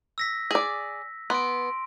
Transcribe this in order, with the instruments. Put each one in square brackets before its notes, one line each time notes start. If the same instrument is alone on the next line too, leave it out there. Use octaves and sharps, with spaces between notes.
[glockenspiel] E6 A#6 B6
[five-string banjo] G#4 D5
[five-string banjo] B3 [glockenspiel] C6 D7